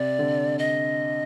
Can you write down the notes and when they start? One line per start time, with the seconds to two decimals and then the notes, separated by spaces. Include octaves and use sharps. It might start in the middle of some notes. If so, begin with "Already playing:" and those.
Already playing: C3 D5
0.19 D3
0.59 D#5